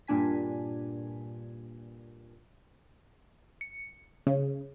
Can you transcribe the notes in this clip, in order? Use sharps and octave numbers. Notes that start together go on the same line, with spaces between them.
G2 A#2 D4 G#5 B6
C#7
C#3